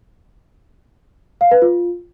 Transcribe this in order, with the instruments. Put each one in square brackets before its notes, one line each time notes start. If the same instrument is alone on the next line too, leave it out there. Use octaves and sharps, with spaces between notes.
[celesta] F5
B4
F4